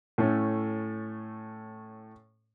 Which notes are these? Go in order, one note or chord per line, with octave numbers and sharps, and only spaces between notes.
A2 A3 C#4